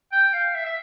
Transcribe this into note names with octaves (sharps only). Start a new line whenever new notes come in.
G5
F5
E5
E5